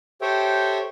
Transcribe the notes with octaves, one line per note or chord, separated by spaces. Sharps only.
G4 A4 C5 C#5 E5 G5